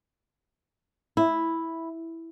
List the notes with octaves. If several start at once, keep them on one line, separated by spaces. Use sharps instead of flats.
E4